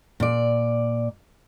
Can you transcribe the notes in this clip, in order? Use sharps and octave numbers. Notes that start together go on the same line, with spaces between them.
A#2 D5